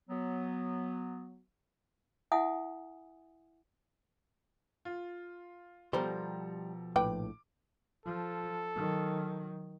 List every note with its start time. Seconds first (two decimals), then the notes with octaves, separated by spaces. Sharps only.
0.09 F#3 B3
2.32 E4 E5 F#5 G#5 D#6
4.85 F4
5.93 B2 F3 G3 G4 A4 C5 A#5
6.96 A#1 A2 B4 G5 D6
8.05 F3 A4
8.76 D#3 F#3